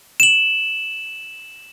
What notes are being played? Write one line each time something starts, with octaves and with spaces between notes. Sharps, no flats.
E7 F#7